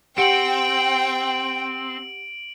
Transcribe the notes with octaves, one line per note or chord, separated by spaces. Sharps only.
C4 G4 F#5 G5 C#7 D7 F#7